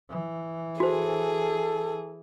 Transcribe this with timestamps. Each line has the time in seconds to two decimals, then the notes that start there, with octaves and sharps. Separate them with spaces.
0.11 E3
0.80 F#4 G#4 A4 C5